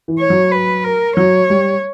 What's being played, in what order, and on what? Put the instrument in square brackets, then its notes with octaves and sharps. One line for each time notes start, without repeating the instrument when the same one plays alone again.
[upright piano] E3
[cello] C#5
[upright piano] F#3
[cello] B4
A#4
[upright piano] F#3 [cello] C#5
[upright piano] G3